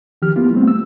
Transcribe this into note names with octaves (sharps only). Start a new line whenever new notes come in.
D#3 F3 G4 F6
A#3 B3 E4 F4 G4
G3 A3 B3 C4
E6